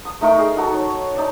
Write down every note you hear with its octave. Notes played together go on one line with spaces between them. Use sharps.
D#6
A3 D#4 A#4 C#6
G#4
D#4 F#4 A4
C#5
D#4 D5